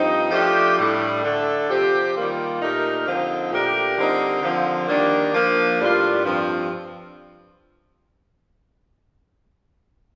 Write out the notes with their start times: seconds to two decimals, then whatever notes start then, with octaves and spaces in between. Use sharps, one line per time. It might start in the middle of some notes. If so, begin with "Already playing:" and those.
Already playing: G2 F3 C4 D#4 G4
0.31 F3 A3 D4 G4
0.77 A2 G3 D4
1.23 D3 A3 D4 A4
1.68 C3 F3 C4 G4
2.14 D#3 G3 A#3 F4
2.60 A#2 A3 D#4 G4 A#4
3.05 D3 F3 C4 D#4
3.51 A#2 A3 D4 G4 A#4
3.96 D3 G3 C4 D#4 A#4
4.42 D3 F3 C4
4.88 D#3 G3 A#3 D4
5.34 F3 A#3 D4
5.79 A2 G3 D4 F4 A#4
6.24 G2 F3 C4